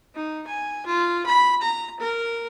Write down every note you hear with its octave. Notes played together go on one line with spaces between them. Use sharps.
D#4
G#5
F4
B5
A#5
A#4